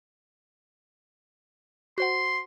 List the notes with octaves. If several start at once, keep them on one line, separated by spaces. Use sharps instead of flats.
F#4 C5 F#5 C6